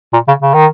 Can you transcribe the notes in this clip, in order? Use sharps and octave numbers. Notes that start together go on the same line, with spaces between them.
A#2
C#3
C#3
D#3